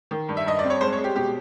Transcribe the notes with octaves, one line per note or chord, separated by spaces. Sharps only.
D#3
G2
E5
G2 D#5
C4 D5
C#5
G#3 C5
C#5
G#3
G4
B2 G4